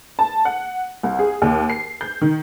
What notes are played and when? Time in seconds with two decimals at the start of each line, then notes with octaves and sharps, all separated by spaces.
0.19 A5
0.45 F#5
1.03 C2
1.19 G#4
1.42 D#2
1.70 C7
2.01 G6
2.22 D#3